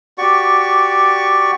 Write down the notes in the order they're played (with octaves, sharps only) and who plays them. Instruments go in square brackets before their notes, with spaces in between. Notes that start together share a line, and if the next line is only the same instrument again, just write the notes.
[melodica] F#4 G4 D5 C#6